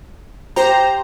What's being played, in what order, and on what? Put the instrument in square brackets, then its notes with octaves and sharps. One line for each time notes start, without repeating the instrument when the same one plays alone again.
[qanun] G4 [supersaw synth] C5 A#5